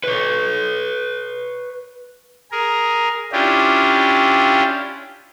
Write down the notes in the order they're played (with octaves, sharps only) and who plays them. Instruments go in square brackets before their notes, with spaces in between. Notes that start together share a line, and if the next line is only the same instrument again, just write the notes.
[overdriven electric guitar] B4 C#5
[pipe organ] G#4 A#4
C#4 D4 E4 F4 G4